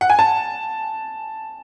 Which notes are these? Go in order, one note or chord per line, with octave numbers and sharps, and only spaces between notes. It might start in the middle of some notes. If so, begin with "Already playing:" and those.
F#5
G#5
A5